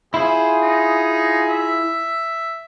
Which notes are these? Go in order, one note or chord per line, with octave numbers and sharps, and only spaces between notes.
E4 F4 G#4 C5
D#4
E5